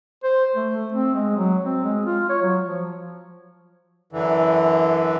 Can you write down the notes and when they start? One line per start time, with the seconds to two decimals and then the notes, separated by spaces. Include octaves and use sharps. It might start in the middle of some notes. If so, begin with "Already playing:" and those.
0.24 C5
0.55 A3
0.74 A3
0.93 C4
1.14 G#3
1.37 F#3
1.65 C4
1.84 G#3
2.06 F4
2.30 C#5
2.42 F#3
2.67 F3
4.13 F#2 D3 E3